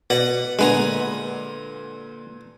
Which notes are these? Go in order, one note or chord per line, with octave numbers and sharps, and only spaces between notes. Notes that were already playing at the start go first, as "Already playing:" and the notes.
B2 B4 D5 F#5
A#2 D3 G#3 B3 B4 G#5 A#5